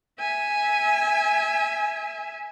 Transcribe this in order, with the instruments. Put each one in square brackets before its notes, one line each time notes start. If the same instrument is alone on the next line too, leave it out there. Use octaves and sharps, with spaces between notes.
[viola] E5 G#5